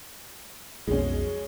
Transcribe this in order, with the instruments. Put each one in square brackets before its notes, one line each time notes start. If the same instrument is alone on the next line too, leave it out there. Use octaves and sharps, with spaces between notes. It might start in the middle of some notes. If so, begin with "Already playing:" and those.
[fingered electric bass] B1 F2 B2 [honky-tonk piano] G#3 C#4